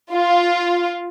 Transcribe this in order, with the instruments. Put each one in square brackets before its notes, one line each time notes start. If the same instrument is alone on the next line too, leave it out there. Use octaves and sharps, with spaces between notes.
[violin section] F4